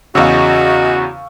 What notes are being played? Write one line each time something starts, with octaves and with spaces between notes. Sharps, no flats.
E2 C#3 F#4 D#5 F5 C#6 E6